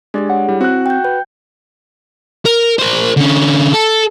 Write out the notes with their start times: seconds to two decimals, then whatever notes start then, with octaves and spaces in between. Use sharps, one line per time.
0.14 G#3 D4 G4 G#4 D5
0.30 C#5 F#5
0.49 G3 E4
0.61 C4 F#4 F#6
0.86 G5 G6
1.05 B4 G6
2.45 A#4
2.79 A#4 C5
3.17 D3 C#4
3.73 A4